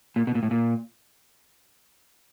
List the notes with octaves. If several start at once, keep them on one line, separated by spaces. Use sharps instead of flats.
A#2
B2
A#2
A2
A#2